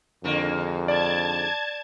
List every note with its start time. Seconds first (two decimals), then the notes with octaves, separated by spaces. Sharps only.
0.24 F2 G#2 D3 A#3
0.88 D5 A5 G#6